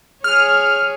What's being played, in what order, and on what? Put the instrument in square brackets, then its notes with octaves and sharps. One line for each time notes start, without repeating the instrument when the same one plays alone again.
[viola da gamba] G#4 C#5 [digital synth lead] F6